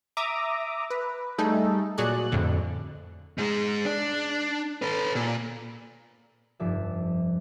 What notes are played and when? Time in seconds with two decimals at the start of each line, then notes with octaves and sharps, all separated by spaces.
0.17 E5 A#5 D6 D#6
0.90 B4
1.38 G3 A3 D#4 G#4 A4
1.98 A#2 F#3 G#4 D5 F#6
2.32 F2 A2 D3
3.38 G#2 G#3
3.85 D4
4.82 A4 B4
5.15 A#2
6.60 F1 G2 F3 D5 E5